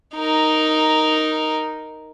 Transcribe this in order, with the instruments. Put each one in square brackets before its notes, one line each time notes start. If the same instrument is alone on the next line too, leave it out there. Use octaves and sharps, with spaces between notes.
[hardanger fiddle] D#4 A#4